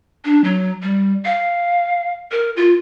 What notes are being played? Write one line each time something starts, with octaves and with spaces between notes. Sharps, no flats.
D4
F#3
G3
F5
A#4
F4